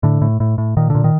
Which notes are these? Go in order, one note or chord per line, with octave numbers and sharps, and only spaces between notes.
A2 D3
A2
A2
A2
A#2 D#3
A#2 D3
D#3